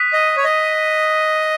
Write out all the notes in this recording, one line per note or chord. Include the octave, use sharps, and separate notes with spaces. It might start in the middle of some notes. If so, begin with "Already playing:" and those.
Already playing: D#6 F#6 B6 D#7
D#5
C#5
D#5